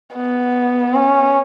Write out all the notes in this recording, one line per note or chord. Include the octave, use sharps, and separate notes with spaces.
B3
C#4